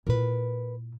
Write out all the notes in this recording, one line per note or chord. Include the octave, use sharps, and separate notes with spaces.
A#2 E4 A#4 B4